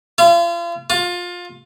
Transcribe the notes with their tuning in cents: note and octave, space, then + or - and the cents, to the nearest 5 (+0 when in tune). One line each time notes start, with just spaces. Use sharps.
F4 -40
F4 +20